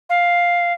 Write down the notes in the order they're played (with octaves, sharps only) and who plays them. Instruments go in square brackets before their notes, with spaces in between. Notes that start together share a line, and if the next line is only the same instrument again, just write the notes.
[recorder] F5